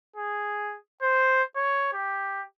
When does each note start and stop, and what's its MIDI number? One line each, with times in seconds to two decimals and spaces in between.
0.16 0.77 68
1.02 1.43 72
1.56 1.91 73
1.93 2.42 67